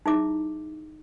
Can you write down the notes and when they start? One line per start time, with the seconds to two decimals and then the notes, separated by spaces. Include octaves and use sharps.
0.06 D#4 E4 G#4 E5 D6